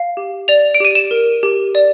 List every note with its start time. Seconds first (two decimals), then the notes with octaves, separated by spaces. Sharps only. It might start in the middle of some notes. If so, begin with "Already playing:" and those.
Already playing: F5
0.17 G4
0.48 D5 F7
0.75 D7
0.80 G4 D#7
0.95 E7
1.11 A#4
1.43 G4
1.75 D5